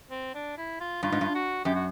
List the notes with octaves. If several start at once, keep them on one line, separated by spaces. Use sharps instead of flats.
C4
D4
E4
F4
G2 F4
G#2
G2
F#4
F#2 G4
F#4